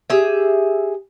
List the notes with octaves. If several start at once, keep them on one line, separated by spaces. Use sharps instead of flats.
G4 G#4 E5